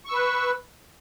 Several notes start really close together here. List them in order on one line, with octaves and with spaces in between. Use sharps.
C#6 E6 B4